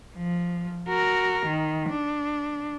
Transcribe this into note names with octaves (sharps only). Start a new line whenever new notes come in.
F3
F#4 A#4
D#3
D4